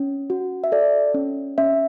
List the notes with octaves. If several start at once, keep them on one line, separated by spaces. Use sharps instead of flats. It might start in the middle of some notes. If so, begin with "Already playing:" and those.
Already playing: C#4
F#4
E5
A4 D5
C#4
C#4 E5